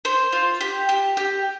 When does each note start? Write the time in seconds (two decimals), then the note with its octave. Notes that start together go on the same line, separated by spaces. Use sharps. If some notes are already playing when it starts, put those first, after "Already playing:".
0.05 C5
0.32 F4
0.61 G4
0.89 G4
1.17 G4